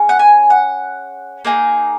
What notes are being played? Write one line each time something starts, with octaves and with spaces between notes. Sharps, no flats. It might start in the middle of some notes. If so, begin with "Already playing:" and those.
Already playing: C#4 G#4
F#5
G#5
F#5
A#3 D#4 G#4